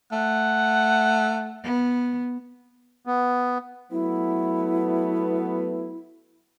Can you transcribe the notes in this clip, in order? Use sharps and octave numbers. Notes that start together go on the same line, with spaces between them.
A3 F#5
B3
B3
F#3 A3 B3 E4